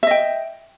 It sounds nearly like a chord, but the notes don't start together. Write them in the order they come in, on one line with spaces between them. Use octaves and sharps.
E5 D#5 G5